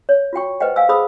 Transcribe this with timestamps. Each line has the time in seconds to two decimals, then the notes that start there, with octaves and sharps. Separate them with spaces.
0.09 C#5
0.33 F4 F#4 G5 C#6
0.60 B4 C5 D#5 F#5 G5
0.76 F5 G#5 E6
0.89 G#4 C5 B5 D#6 E6